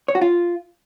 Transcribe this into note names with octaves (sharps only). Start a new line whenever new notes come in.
C#5
F#4
F4